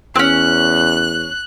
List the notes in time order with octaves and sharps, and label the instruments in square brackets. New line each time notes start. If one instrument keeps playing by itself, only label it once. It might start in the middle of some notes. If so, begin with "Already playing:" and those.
[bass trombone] E2 [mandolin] C4 C#4 [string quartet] F#6